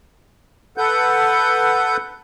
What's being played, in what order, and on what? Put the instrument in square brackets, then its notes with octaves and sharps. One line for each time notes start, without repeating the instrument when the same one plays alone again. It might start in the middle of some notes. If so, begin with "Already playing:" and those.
[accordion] A4 B4 F#5 G6